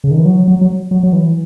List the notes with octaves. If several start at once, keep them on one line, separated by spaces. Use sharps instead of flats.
C#3
D#3
E3
F#3
F#3
F#3
F#3
F#3
E3